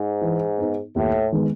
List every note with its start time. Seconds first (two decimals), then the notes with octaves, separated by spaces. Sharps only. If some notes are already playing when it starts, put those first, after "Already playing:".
Already playing: G#2
0.21 E3
0.57 B3 D#4
0.95 D#2 A2
1.32 D#3 G#3 B3